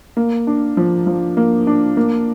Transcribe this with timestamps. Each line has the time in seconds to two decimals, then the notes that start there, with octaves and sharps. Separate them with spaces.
0.17 A#3
0.47 D4
0.77 F3
1.07 F3
1.37 A#3
1.67 D4
1.97 A#3